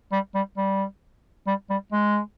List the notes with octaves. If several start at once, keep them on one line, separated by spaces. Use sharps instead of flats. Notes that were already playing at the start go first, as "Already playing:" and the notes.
G3
G3
G3
G3
G3
G#3